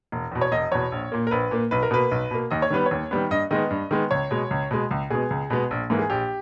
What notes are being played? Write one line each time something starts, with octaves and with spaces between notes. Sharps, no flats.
E1
E2 B2
C#5
E1 D#5
E2 B2 C#5
A#1
A#2 A#3
A#4
A#1 B4
A#2 A#3
B1 B4
A#4
B2 A#3 B4
B1
B2 A#3
D#2 D#5
C#5
D#3 G3 B3 B4
C#5
D#2
D#3 G3 B3
G2 D#5
D#3 G#3 B3 D#5
G2
D#3 G#3 B3
C#2 C#5
B2 G#3
C#2
B2 G#3
C#2
B2 G#3 B3 G#4
C#2
B2 G#3 B3
A#1
G#2 E3 A#3
G#4
A#1 G4